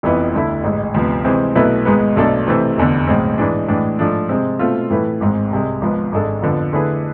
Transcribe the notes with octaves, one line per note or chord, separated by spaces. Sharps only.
F1 F2 E3 B3 E4
D2 D3 A3 E4
A1 G#2 G#3
D2 C3 F3 B3
C3 E3 G#3 C4
B1 B2 A3 E4 B4
G#1 G#2 G#3 B3
B1 B2 A3 D4 A4
C3 E3 A3 C4
F1 E2 D3
B1 A2 G#3 C4
G#2 E3 G#3 D4
A2 E3 G#3 D4
G#2 F3 A3 D4
C3 G#3 C4
B2 A3 C4 F4
A2 E3 A3 E4 B4
G#1 G#2 G#3 C4
C2 C3 G#3
G#1 G#2 F3 B3
G#1 G#2 G#3 D4 A4
F2 D3 F3 B3
D3 A3 E4 G#4 B4